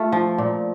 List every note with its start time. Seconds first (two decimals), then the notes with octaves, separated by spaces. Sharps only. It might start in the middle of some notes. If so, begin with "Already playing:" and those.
Already playing: A3 F4
0.12 F3
0.38 A#2